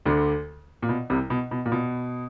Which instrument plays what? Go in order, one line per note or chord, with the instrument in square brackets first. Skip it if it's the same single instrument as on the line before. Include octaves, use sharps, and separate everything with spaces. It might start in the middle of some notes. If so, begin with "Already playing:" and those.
[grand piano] D2 D3
A#2
B2
C2 C3
B2
B2
A#2
B2